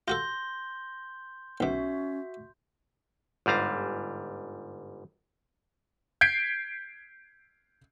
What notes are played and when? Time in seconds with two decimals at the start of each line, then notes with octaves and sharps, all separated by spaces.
0.08 F4 F#4 A4 C6 G6 A#6 G7
1.60 B1 B2 C#4 F#4 E5
3.46 G1 G#2 G3 F5 A#5
6.21 G6 G#6 B6 C7 D7